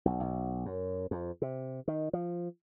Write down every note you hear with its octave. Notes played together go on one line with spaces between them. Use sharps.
B1
B1
F#2
F2
C3
D#3
F3